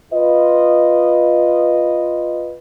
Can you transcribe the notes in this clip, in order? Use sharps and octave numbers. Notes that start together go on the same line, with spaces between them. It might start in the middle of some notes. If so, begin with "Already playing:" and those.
F4 B4 D#5